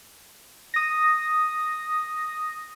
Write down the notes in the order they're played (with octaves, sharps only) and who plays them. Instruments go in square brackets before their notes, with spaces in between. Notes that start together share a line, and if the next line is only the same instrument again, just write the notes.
[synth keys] D#6 A#6